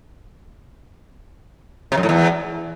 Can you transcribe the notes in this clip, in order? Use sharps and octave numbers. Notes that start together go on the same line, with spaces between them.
C3
F#2
A2
E2